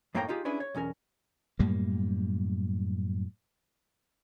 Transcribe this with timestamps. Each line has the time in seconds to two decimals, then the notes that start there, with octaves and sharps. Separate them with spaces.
0.15 F#2 A2 A#3 C#5 G5 A#5
0.29 D#4 F4 G4 G#4
0.45 C#4 D4 E4 G#4 B4
0.60 C#5
0.75 B1 E2 C#4 A#4
1.59 F#2 A2 G3 A#3